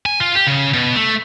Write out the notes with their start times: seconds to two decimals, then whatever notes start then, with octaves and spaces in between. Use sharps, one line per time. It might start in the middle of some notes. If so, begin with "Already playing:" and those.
0.06 G#5
0.20 F4
0.35 G4
0.47 C#3
0.73 B2
0.96 A3